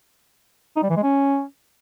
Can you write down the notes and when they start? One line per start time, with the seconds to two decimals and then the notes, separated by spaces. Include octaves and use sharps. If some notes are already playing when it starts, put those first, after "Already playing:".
0.76 D#4
0.83 G3
0.90 E3
0.97 G#3
1.03 C#4